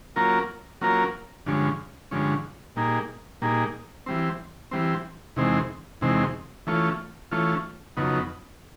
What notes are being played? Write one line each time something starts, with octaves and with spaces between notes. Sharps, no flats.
F#3 A#3 C#4 F4 A#4
F#3 A#3 C#4 F4 A#4
G2 D3 F3 G#3 C#4
G2 D3 F3 G#3 C#4
A#2 G3 A#3 D#4 G#4
A#2 G3 A#3 D#4 G#4
E3 G3 C4
E3 G3 C4
E2 C3 D#3 G#3 C4
E2 C3 D#3 G#3 C4
E3 A3 C#4 F4
E3 A3 C#4 F4
F2 C#3 F#3 B3 D#4